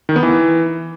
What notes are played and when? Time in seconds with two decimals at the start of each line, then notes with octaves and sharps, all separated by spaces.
0.09 D#3
0.16 B3
0.23 E3